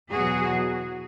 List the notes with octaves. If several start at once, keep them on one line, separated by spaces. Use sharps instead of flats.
E2 B2 F#3 F#4 G#4